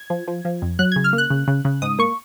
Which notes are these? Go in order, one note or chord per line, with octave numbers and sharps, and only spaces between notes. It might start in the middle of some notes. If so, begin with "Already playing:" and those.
Already playing: G#6
F3
F3
F3
F2
F#3 F#6
C#3 G#6
F6
A#3
F#6
C#3
C#3
C#3
G#2 D#6
A#3 C#6